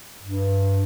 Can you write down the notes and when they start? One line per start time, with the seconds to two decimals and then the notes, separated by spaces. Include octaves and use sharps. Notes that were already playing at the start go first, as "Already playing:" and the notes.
0.23 G2